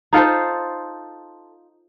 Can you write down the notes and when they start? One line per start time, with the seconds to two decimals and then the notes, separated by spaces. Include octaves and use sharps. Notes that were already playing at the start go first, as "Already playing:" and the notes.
0.13 D#4 F4 A4 C5